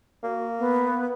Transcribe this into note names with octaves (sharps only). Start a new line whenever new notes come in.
A#3 F#4
B3